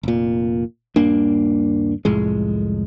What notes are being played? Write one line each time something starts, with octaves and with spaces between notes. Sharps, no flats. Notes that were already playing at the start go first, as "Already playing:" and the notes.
F1 A#2
D#1 G2 A#3 D4
C2 F2 A2 G#3